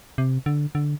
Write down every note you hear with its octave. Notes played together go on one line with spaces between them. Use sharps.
C3
D3
D3